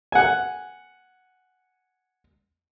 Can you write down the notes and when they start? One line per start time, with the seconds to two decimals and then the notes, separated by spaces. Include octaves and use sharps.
0.12 F#5 G#5